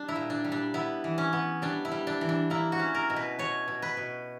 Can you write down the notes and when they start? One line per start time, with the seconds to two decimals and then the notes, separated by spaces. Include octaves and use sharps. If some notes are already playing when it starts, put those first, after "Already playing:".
Already playing: G3 D4
0.08 E4
0.16 A#2
0.30 D4
0.44 G3
0.52 D4
0.74 B3 E4
1.04 E3
1.18 C#4
1.33 B3
1.62 G3 D4
1.85 E4
1.92 G3
2.07 D4
2.21 E3
2.29 D4
2.50 A#3 E4
2.72 F#4
2.79 C#4
2.95 A#4
3.10 B2
3.16 B4
3.39 B2 C#5
3.68 B2
3.82 B4
3.97 B2